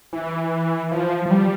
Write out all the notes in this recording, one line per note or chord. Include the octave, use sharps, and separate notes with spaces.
E3
F3
F3
G3